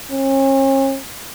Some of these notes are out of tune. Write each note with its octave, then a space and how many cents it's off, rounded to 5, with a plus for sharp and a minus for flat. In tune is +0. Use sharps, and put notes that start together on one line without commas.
C#4 -40